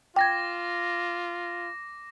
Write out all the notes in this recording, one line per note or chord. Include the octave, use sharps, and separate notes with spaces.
F4 G5 D6 G#6 A#6